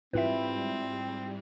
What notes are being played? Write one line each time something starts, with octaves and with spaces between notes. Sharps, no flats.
G#2 G3 C4 E4 F4 B4 E5